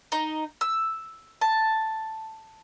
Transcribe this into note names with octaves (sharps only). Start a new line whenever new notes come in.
D#4
E6
A5